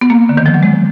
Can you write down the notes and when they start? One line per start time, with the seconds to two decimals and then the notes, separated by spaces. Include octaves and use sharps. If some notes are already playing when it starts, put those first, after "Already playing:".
0.01 B3
0.10 A#3
0.29 D3
0.37 D#3
0.46 F3
0.54 F#3
0.63 G#3